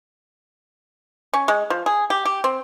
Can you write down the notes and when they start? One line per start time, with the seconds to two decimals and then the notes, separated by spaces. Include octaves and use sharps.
1.33 C#4
1.48 G#3
1.70 F3
1.86 G#4
2.10 G4
2.25 G4
2.44 C4